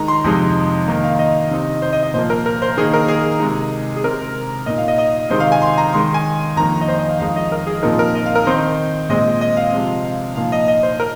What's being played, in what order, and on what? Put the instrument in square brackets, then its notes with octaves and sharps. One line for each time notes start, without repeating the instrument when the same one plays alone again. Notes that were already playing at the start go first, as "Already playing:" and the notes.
Already playing: [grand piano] D#3 G#3 D#4 A#5
C6
F2 C3 G#3 D#4
D#3 A#3 D#4 A#5
F5
D#5
C3 D#3 C4 D#4
C5
D#5
D#5
A#2 F3 A#3 C5
A#4
A#4
C5
D#3 A#3 D#4 G#4
A#4
G#4
C3 G#3 D#4
G#4
C3 G#3 C4 A#4
A#2 A#3 D#4 D#5
F5
D#5
D#5
C3 D#3 G#3 C4 D#4 C5
F5
G#5
C6
A#5
D#3 G#3 D#4 C6
G#5
F2 D#3 A#3 A#5
D#5
C5
D#5
F5
F2 D#3 G#3 D#4 F5
D#5
A#4
G#4
A#2 F3 C4 D#4 A#4
A#4
D#5
F5
A#4
D#3 C4 D#4 C5
A#2 G#3 C4 D#5
D#5
F5
C3 F3 G#3 C4
F5
A#2 F3 A#3 D#4 F5
D#5
D#5
C5
A#4